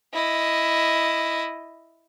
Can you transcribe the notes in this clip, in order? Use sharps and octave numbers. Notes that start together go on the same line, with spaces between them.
E4 D#5